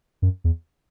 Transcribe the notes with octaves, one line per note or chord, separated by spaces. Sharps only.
F#2
E2